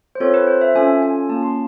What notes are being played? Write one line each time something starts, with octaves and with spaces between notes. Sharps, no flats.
C5
C4 F4 A4 C#5
B4
C5
E5
C#4 F4 A4 G#5
G#5
A#3 C#4 F4 A5
C6